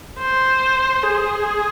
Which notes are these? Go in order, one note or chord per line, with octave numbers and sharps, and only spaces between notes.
C5
G#4